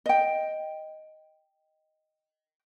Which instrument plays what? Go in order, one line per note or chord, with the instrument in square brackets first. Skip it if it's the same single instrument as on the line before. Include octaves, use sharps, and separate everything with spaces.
[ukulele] D#5 G5